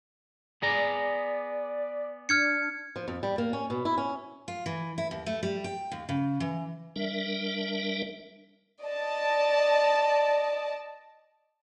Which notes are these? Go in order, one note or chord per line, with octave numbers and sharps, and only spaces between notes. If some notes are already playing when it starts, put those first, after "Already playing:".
B3 G#4 D5 A#5
D4 F6 G#6 C#7
F3
F2
G3
A#3
C#4
B2
E4
C#4
F4
E3
E4
D#2
A3
G3
G5
D#2
C#3
E3
G3 D4 A#4 E5
D5 D#5 A5